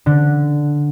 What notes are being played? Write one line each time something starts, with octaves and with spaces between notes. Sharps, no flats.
D3